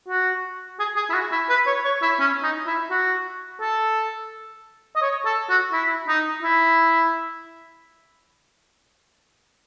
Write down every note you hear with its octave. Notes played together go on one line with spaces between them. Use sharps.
F#4
G#4
G#4
E4
F#4
E4
B4
C#5
C#5
E4
C#4
D#4
E4
F#4
A4
D#5
C#5
A4
F#4
E4
D#4
E4